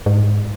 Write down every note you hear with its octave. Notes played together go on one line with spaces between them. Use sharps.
G#2